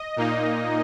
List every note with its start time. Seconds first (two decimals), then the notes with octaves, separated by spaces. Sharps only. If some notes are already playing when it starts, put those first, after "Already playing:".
Already playing: D#5
0.16 A#2 A#3 D#4